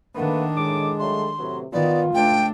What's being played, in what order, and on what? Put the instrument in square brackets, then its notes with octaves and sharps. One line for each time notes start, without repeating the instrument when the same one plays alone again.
[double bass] D#3 D4 [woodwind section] A3 B4 F#5 [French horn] A#3
[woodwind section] A2 D6 [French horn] G#3
[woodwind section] F#3 G3 A3 [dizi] C6
[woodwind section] A2 F#3 B3 [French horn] C3
[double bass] D#3 [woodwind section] B3 [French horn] F4 [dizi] D5
[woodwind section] C#2 [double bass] A3 D4 [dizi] G5